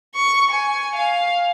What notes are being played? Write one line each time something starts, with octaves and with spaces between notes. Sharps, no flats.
C#6
G#5
F5